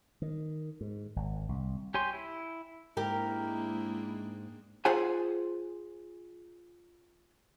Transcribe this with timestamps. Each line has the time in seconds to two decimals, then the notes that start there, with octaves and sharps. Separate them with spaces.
0.22 D#3
0.81 G#2
1.16 G#1
1.49 C2
1.94 G4 C#5 G#5 C6
2.13 E4
2.97 G#2 G#3 A#3 D4 E4 G4 A#4
4.85 F4 G#4 C5 F#5 G#5